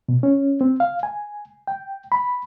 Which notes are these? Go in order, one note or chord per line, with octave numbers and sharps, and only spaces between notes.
B2
C#4
C4
F5
G#5
G5
B5